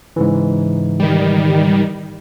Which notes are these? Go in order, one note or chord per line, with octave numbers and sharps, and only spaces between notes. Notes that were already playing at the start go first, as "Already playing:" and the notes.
G#2 C#3 E3
D#3 G3